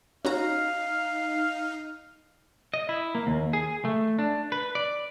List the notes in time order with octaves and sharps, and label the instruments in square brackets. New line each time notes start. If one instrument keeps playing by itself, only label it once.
[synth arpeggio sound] C#4 F#4 A#5 [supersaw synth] D#4 [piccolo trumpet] F5
[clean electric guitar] D#5
E4
A#3
D#2
G#4
A3
D4
B4
D5